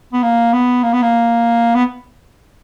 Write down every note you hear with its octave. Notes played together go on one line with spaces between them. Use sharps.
B3
A#3
B3
A#3
B3
A#3
B3